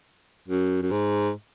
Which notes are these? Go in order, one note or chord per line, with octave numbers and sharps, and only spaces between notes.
F#2
F#2
G#2